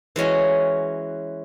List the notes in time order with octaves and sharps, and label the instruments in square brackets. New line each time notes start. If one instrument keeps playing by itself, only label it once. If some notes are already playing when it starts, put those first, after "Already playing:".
[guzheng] E3 G#3 C#4 F#4